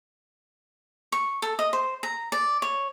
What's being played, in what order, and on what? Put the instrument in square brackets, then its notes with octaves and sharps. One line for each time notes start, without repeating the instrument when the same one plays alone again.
[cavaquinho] C#6
A4
D#5
C5
A#5
D5
C#5